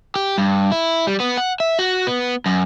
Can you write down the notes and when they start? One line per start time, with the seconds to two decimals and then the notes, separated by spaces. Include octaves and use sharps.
0.16 G4
0.38 G2
0.72 E4
1.07 G3
1.20 B3
1.38 F#5
1.60 E5
1.79 F#4
2.07 B3
2.46 F#2